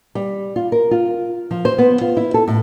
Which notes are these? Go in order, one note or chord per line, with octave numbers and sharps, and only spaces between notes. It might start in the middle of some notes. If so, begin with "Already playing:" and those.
G3
F4
A#4
F4
F3
C5
B3
F4
E4
A4
A2